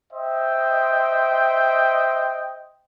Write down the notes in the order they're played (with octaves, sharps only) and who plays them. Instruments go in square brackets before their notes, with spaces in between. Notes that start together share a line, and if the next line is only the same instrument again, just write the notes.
[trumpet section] C5 D#5 E5 G5